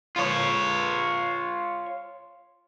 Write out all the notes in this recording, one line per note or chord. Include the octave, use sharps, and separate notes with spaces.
F4 C#5